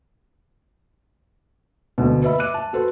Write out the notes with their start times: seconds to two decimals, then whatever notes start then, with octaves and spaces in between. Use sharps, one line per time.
1.98 D2 B2
2.24 B4 D#5 E5 B5
2.39 E5 D6 F#6 D#7
2.54 A5
2.73 F#4 A4 B4 C5